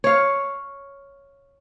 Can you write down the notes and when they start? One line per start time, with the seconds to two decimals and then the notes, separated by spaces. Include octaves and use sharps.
0.04 C#5 F5